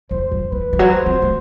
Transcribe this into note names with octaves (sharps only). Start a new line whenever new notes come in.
E2 C5
F#2
E3 B4
E3
F#3
C5
C4
A3